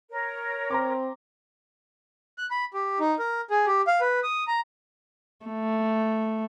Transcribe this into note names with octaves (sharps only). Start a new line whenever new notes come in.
A#4 C#5
C4 A#5 C6 D6
F#6
B5
G4
D#4
A#4
G#4
G4
F5
B4
D#6
A#5
A3